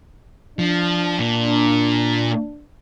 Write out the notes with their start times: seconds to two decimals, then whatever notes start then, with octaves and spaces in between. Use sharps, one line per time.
0.59 F3 D4
1.19 A#2